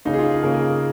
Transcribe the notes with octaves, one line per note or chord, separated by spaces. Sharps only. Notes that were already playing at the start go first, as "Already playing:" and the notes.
C#3 A#3 D#4
G#4
F4
G#4
C#3 A#3 A#4
G#4